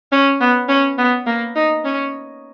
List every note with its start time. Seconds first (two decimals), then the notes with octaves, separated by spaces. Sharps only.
0.12 C#4
0.40 B3
0.68 C#4
0.98 B3
1.26 A#3
1.55 D#4
1.84 C#4